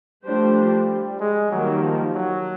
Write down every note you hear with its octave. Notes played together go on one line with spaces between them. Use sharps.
F3 G3 A3 D4 G4 C5
G#3
D#3 F#3 G3 A#3
F3
F#3